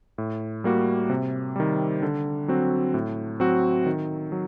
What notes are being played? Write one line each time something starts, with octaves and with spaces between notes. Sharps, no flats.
A2
G3 A#3 F#4
C3
D#3 G3
D3
F#3 C4 F#4
A2
F#3 C4 F#4
D#3
F#3